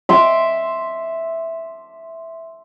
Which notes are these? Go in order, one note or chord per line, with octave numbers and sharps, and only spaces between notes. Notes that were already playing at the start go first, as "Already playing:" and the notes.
E5 C6 D6